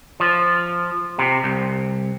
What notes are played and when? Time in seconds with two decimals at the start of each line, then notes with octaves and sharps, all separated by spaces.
0.20 F3
1.19 C3
1.44 C2